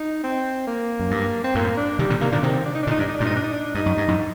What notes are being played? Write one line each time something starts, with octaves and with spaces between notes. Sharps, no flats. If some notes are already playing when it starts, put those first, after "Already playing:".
Already playing: D#4
C4
A#3
F#2
G2
C4
F#2 A2 A#3
D4
C3 D#3 G3
A#2 D3
C3 D#3 A#3
A#2 D3 D4
C3 D#3 C4
D4
D#4
D4
A#2 D3
D#4
G2 D4
D#4
G2 A#2 D4
D#4
D4
D#4
D4
G2 D#4
F#2
G2
F#2 A2